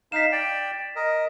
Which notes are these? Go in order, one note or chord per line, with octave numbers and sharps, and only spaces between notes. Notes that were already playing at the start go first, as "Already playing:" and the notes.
D#4 F5 B6 E7
D5 G5
A#4 D#5